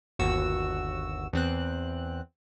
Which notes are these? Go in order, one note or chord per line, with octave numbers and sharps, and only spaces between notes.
G1 D#2 F#4 E6
E2 C4 F#6